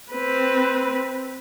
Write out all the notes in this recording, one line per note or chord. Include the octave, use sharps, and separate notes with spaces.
C4 B4